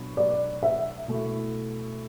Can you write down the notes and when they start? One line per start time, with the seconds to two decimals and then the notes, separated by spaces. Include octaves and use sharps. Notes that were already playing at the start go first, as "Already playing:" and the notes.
Already playing: B2 F#3 B3 D4
0.17 D5
0.63 E5
1.08 B2 A3 E4